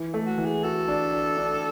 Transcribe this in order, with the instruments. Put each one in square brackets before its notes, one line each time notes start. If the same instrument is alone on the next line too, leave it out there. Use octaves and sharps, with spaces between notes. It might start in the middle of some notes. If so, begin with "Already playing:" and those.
Already playing: [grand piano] E3
A3
[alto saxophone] F#4
[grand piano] E3
[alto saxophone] G#4
[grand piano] F#4 [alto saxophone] A4
[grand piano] D4
D4
D4